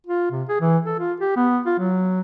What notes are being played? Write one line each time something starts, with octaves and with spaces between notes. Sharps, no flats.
F4
C3
G#4
E3
A4
F4
G4
B3
F4
F#3